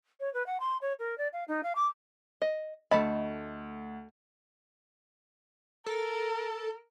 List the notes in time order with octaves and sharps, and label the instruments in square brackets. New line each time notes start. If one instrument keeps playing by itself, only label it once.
[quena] C#5
B4
F#5
C6
C#5
A#4
D5
F5
D#4
F5
D6
[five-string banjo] D#5
[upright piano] D2 [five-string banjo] A3 A5 B5 [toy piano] D#5
[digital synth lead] A4 [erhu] A#4